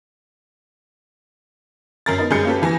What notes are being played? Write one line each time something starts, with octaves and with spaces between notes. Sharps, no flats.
F#2 A#4 A6
B3 D#4 A#4
F#2 G3 G#3 G#4 G6 C#7
A#3 C#4 G4 A4 B4
F2 E3 G#5 A#6